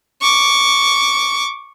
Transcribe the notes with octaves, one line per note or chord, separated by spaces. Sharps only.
C#6 D6